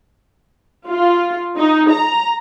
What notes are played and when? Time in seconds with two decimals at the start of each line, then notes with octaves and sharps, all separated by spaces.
0.90 F4
1.57 D#4
1.92 A#5